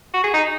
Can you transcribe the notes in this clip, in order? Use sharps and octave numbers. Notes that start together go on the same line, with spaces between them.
F#4
G#4
D#4